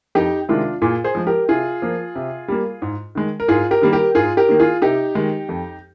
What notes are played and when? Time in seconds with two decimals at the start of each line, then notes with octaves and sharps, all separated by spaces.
0.15 F2 D#4 G4
0.49 C3 D#3 G#3 D4 F4
0.82 A#2 F4 G#4
1.04 G#4 C5
1.15 F3 G#3
1.27 G4 A#4
1.49 C3 F4 G#4
1.82 F3 A#3
2.15 C3
2.48 G3 A#3
2.82 G#2
3.15 D#3 G#3
3.40 A#4
3.48 G#2 F4 G#4
3.71 G4 A#4
3.82 D#3 G3 A#3
3.93 G4 A#4
4.15 G#2 F4 G#4
4.37 G4 A#4
4.49 D#3 A#3
4.60 F4 G#4
4.82 C3 D#4 G4
5.15 D#3 G#3
5.49 F2